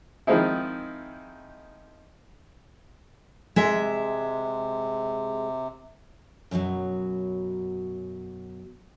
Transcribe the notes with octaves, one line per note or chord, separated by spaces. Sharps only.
D#3 F3 G#3 C4 D#4 E4
C3 G#3 E5
F#2 B2 D3 F#3